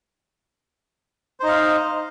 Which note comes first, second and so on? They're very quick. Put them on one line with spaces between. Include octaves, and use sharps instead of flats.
C5 D#4 D#5 F5